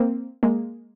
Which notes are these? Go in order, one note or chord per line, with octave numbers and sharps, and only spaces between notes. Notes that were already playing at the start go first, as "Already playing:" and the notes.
Already playing: A#3 C4
G#3 A#3